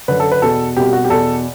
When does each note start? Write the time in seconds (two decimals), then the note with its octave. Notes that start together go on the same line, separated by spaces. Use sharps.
0.08 F#2 D3 B4
0.20 A4
0.32 B4
0.42 E2 B2 A4
0.76 C2 B2 G4
0.93 F#4
1.04 G4
1.09 E2 B2 A4